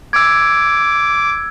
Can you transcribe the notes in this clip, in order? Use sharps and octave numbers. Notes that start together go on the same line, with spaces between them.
D6 E6 G#6